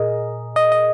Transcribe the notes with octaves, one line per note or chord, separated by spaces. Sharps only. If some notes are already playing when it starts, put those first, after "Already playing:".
Already playing: A#2 G#4 A#4 D#5
D#5
D#5